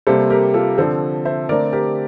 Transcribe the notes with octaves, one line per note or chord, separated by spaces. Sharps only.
C3 G3 A#3 A4 C5
G4 A#4
F4 A4
D3 F3 C4 A4 C5
C5 E5
D3 A3 C4 A#4 D5
G4 A#4